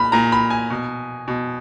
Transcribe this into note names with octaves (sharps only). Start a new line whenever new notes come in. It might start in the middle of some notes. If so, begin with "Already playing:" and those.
Already playing: A#2 B5
A#2 A#5
B5
G#5
B2
B2